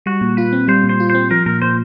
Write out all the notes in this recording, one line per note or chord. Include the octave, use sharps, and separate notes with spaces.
G3 F#4
A#2
F4 B4
C4
G3 C5
A#2
C5
F4
C4 C5
F3 A#4
A#2 A#4
A#2 C5